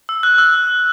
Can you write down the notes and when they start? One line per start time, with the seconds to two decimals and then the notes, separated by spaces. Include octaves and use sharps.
0.09 E6
0.23 F#6
0.38 E6